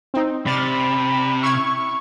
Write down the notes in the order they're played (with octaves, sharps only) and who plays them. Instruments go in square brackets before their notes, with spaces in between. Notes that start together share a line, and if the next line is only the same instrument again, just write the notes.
[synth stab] C4 D#4
[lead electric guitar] C3 [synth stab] D5 F6 A6 [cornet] B5
[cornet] E4 [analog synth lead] C#6 [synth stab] E6 F6 G#6